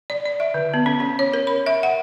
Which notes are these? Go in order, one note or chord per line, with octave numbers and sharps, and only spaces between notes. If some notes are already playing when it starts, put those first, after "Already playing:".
D5
D5
E5
D3
B3
C#4
C#4
C#5
A#4
B5
E5
F#5